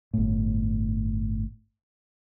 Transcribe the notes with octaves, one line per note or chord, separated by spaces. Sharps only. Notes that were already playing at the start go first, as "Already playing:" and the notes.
G1 A2